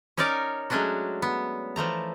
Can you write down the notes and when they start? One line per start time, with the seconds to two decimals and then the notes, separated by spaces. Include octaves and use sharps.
0.17 C#4 D#4 A#4 C#5 D5
0.70 F#3 G#3 A3 C#4 D4 F#4
1.22 B3
1.76 E3 F3 A3 A#5